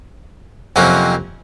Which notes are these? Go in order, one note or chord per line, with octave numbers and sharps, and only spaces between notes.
F2 C3 F#3 A#3 C#4